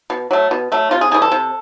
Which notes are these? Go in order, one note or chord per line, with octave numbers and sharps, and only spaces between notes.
B2
F#3 A3
B2
F#3 A3
C3 F4
G#4
E3 G3 G#4
A4
C3